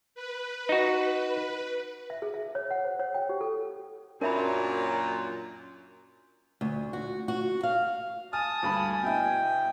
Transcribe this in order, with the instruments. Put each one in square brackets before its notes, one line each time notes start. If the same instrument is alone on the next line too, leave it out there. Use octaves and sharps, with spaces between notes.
[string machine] B4
[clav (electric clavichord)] D#4 F#4
[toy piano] E5
G#4
E5
C#5
F#5
C5
C#5
G5
G4
A4
[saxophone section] F#2 A#2 [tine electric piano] C#4 D4 [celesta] A#4 E5 B5
[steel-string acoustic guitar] D2
F#4
F#4
F5
[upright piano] G#5 F6 [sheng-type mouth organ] A5 D#6
[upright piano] D2 G2 B5 [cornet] G#5
[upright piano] B2 E4 [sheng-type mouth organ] G5